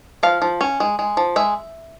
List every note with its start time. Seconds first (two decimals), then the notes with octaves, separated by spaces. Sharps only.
0.23 F3 F5
0.42 F3
0.61 C#4
0.80 G#3
0.99 G#3
1.17 F3
1.36 G#3 E5